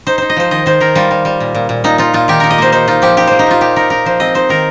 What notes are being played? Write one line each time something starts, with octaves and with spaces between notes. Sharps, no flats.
D#4 C5
D#4 C5
D#5
F3 C5
D#3 D#5
D#3 C5
D#3 A#4
G3 F4
G3
G3
A#2
A#2
A#2
A#2 D#4
D#4 F4
A#2 F4
D#3 G4
D#4 A#4
D#5
A#3 C5
D#4 C5
D#4 F4
F3 G4
D#4 G4
A#3 C5
D#4
A#3 F4
A#2 G4
D#4 A#4
D#4 A#4
F3 C5
C4 D#5
D#4 C5
D#3 A#4